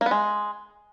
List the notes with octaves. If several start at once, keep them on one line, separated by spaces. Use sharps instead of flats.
A#3
B3
G#3